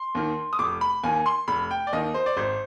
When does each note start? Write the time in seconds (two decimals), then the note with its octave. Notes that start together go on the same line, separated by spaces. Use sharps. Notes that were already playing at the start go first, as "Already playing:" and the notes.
Already playing: C6
0.15 D#2 D#3
0.53 D#6
0.59 F1 D6
0.81 B5
1.03 D#2 D#3 G#5
1.26 C6
1.48 F1 B5
1.71 G5
1.87 D5
1.93 D#2 D#3 D#5
2.14 C5
2.26 D5
2.37 G#1 C5